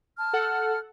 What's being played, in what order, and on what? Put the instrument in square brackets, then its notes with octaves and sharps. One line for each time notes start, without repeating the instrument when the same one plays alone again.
[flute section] A5 F6
[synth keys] A4 F#5